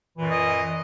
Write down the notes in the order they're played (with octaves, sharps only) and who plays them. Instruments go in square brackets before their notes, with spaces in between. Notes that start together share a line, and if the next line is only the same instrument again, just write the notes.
[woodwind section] F#2 A#2 E3
[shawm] D#5